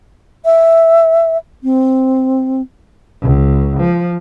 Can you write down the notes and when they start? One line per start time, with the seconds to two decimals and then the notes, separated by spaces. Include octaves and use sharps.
0.45 E5
1.64 C4
3.21 C#2
3.80 F3